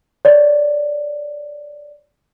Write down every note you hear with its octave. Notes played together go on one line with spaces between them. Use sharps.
C#5 D5